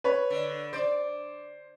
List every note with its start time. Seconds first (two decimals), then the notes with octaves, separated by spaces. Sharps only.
0.04 B4 C#5
0.30 D3
0.73 C5 D5